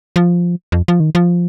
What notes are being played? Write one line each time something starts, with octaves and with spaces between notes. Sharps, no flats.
F3
F2
F3
D#3
F3